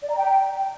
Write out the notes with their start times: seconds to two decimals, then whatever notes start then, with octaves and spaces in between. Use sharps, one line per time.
0.02 D5
0.10 A#5
0.17 G5